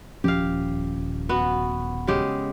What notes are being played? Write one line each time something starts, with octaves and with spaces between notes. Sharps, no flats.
D#1 F3 C#4 G4 F5
B3 F#4
C#3 G#3 G4